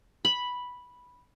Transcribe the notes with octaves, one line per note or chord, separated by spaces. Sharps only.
B5